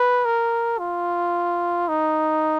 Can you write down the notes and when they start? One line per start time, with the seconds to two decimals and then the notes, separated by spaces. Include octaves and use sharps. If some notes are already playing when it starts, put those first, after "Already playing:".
Already playing: B4
0.25 A#4
0.79 F4
1.89 D#4